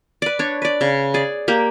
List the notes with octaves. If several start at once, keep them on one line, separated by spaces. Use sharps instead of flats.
B4 D5
D4 C#5
B4 D5
C#3
G#4 D5
A#3 G4